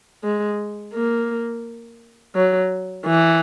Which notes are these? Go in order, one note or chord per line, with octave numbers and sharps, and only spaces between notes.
G#3
A#3
F#3
E3